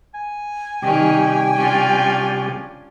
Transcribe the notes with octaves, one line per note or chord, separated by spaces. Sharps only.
G#5
C3 D#3 G3 C#4 G4 G5
C#4 D4 F4